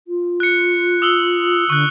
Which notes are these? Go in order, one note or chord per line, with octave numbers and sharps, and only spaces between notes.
F4
F#6 C#7
D#6 E6 G7
D3 C#6 F#6